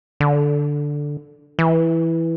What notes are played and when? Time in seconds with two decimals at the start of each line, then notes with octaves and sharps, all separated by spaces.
0.20 D3
1.59 E3